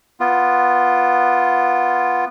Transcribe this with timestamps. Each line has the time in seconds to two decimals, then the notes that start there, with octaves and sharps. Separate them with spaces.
0.20 B3 F4